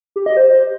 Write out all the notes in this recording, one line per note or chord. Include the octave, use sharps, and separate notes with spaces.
G4
D#5
C5